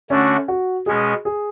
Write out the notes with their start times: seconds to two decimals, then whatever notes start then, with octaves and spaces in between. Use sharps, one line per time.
0.10 D3 A3 C#4 D4 F#4
0.48 F#4
0.86 B2 G#3 C#4 G#4
1.25 G#4